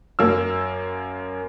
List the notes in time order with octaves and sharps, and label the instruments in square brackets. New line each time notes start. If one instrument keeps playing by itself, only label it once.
[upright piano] F#2 A#3 E6